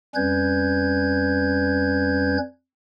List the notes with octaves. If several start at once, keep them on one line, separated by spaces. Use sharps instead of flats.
F2 G3 C#4 B4 G6 G#6